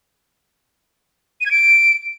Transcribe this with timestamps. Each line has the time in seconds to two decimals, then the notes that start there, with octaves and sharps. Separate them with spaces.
1.41 D#7
1.46 G#6
1.51 D7